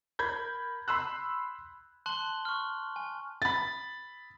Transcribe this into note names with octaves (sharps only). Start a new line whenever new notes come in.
A#4 B5 G6 G#6
B5 C6 E6 F#6
A5 C6 F#6 F#7 G7
C#6 F6
G#5
B5 A6